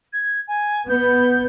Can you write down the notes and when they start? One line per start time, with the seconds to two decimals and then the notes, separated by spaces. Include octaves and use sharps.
0.13 G#6
0.48 G#5
0.88 B3 G6